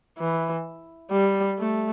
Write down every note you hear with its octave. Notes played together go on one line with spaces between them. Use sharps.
E3
G3
A3